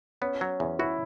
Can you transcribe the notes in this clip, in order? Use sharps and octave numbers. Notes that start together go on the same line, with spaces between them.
B3 C#4
F#3
E2
E4 F#4